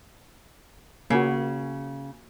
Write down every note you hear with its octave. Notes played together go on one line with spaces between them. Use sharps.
C#3 A#3 F#4